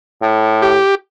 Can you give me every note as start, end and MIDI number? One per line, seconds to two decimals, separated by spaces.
0.22 0.79 45
0.62 0.95 67